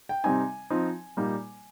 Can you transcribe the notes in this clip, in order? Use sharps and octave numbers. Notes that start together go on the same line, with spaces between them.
G5
C3 G3 C4 D#4 G#5
F3 C4 D#4
A#2 G3 A#3 D#4